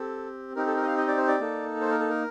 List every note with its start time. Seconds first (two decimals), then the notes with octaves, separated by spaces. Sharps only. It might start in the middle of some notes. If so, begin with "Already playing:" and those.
Already playing: C4 G4 A4
0.56 C4 D#4 G4 A#4
0.67 A4
0.77 A#4
0.83 D#5
0.87 F5
0.98 D#5
1.08 D5
1.17 C5
1.28 D5
1.40 A#3 D#4 A4
1.81 C5
1.91 A#4
2.00 A4
2.10 A#4